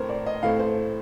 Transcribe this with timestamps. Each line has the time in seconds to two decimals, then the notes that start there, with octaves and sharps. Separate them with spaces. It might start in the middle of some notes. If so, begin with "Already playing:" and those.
Already playing: A2 A3 C4 A#4 C5
0.09 D5
0.26 D#5
0.43 A2 A3 C4 F5
0.59 C5